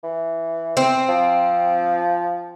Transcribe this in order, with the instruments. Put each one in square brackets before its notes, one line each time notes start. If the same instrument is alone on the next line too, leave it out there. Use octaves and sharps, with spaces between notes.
[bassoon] E3
[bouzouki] C4
[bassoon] F3